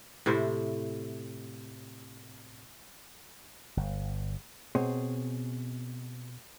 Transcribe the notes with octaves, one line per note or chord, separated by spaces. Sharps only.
A2 C3 E4 C5
G1
B2 C4 G#4 C#5